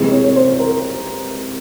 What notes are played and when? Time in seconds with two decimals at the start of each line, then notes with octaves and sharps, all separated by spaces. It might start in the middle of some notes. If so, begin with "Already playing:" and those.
Already playing: C3 E3 G#3
0.11 C#5
0.24 C#5
0.36 C5
0.60 A#4